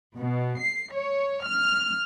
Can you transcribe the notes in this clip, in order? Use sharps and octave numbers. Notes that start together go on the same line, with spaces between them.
B2
C7
C#5
F6